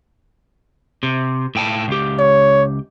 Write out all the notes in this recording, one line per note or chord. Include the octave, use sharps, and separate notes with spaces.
C3
A2 G5 A5
C#2 G4
C#5